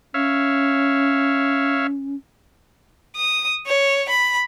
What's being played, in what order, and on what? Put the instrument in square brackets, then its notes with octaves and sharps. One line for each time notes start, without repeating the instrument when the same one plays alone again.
[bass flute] C#4 [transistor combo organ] C#5 E5 F5
[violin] D#6
C#5
B5